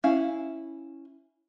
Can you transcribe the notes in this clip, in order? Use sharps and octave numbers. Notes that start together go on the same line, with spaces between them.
C#4 E4 F5